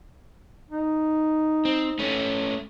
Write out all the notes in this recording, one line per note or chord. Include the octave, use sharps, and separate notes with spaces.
D#4
C4
A3 C#4